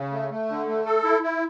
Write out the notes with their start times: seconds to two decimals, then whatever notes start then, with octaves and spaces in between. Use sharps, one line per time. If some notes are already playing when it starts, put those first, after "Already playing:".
Already playing: C#3
0.12 A3
0.30 A3
0.49 D3
0.67 A3
0.86 A4
1.04 E4
1.23 E4